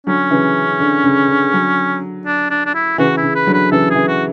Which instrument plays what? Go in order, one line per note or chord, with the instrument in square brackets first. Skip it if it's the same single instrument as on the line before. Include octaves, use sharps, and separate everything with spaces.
[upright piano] D3 F#3 [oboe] C#4
[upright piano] C#3 E3
D3
C#3
D3
D3 F#3
[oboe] D4
D4
D4
E4
[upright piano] C#3 E3 [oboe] F#4
[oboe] E4
[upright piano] C#3
[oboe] B4
[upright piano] D3 F#3
[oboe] B4
[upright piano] C#3 E3 [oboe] A4
[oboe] G#4
[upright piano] C#3 E3
[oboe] F#4